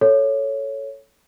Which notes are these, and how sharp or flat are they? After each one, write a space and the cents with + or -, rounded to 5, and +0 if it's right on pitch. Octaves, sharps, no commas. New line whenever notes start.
A4 +0 C#5 +0